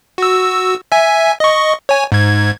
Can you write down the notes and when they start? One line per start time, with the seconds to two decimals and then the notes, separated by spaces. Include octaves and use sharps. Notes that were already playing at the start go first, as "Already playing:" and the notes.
0.18 F#4 E6
0.92 E5 G#5
1.40 D#5 C#6
1.89 C#5 G#5
2.12 G#2 G#6